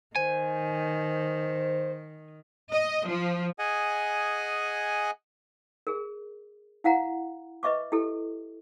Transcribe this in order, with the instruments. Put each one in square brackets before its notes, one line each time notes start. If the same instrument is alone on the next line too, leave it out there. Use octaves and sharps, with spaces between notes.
[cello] D#3 [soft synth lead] C5 [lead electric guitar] G#5
[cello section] D#5
F3
[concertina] G#4 D#5 F#5 G#5
[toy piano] G#4 A#4
E4 F5 F#5 A#5
B4 D#5 E5 C#6 D6
E4 G4 A4